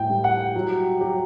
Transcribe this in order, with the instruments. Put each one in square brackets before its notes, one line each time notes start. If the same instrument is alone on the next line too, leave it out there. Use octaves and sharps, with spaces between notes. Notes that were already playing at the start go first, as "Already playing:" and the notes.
Already playing: [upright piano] A2 [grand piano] G5
[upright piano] G3
[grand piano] F#5
[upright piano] F#3
[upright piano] F#3 [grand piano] G4